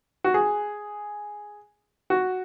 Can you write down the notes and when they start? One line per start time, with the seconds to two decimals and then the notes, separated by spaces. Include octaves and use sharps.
0.24 F#4
0.34 G#4
2.10 F#4